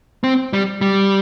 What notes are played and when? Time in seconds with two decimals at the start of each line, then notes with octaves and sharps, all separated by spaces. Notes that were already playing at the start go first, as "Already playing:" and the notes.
0.24 C4
0.53 G3
0.81 G3